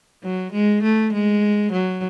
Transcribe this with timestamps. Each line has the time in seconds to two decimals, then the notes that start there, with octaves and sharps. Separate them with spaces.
0.23 F#3
0.53 G#3
0.83 A3
1.13 G#3
1.72 F#3